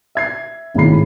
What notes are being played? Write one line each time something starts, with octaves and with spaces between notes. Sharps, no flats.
E5 G#6 C7
G#1 A2 D#3 G#4 B5 C7